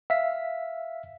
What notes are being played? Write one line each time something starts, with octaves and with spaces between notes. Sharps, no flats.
E5 F5 B6